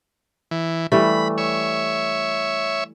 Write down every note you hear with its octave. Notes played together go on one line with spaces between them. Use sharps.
E3
E3 G3 A3 B5
C#5 E5